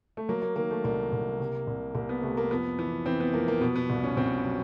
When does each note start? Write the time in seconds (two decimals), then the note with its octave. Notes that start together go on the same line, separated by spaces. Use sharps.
0.17 A3
0.29 F#3 A#3
0.42 A#3
0.56 D#3 A#3
0.71 A3
0.84 C2 A#3
1.12 C2
1.40 C3
1.67 C2
1.95 C2 A#3
2.09 B3
2.22 C3 A3
2.37 A#3
2.50 F2 B3
2.79 E3 B3
3.06 E3 C4
3.20 B3
3.33 F2 A#3
3.48 A#3
3.61 B2 B3
3.76 B3
3.90 C2
4.04 C#4
4.17 C2 C4
4.45 F#3